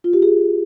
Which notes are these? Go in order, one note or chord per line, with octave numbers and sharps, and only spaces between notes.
F4
G4
G#4